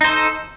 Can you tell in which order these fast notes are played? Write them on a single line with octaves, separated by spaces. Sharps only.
D#4 C5 A4